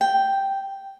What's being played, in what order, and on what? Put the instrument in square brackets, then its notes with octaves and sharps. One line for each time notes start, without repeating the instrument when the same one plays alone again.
[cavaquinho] G5